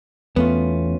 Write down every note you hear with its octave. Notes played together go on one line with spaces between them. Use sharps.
E2 A3 B3 C#4 F4